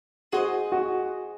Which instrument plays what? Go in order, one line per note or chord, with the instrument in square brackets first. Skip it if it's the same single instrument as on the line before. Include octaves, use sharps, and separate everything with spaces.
[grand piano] F#4 [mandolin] G#4 C5 D#5
[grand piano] F#4